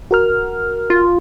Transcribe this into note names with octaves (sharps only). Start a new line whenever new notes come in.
F#4 A#4 F6
F4